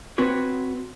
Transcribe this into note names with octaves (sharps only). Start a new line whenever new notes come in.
C4 F#4 B4 C#5